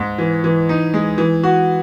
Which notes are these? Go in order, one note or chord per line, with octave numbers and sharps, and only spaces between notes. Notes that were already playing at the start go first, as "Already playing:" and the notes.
Already playing: G#2
E3
E3
D#4
G#3
E3
F#4